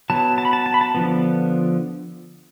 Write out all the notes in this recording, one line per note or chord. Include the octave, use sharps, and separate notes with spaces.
F#3 B3 A5
A5
B5
A5
A5
B5
A5
D3 F3 B3